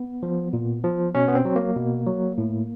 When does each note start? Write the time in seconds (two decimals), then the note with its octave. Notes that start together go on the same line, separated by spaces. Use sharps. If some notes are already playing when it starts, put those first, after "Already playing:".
Already playing: B3
0.23 F3
0.53 A#2
0.84 F3
1.15 B2 C#4
1.28 B3
1.35 C4
1.45 F#3
1.56 A#3
1.76 B2
2.07 F#3
2.38 A2